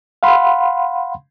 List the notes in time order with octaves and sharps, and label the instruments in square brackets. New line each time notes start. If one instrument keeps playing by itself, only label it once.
[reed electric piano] F5 F#5 B5 C6